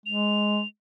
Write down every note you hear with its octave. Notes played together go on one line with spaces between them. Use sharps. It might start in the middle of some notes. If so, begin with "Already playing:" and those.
G#3 F7